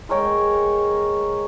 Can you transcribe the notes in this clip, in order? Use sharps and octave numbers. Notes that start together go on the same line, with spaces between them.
G#3 A#4 C#5 G5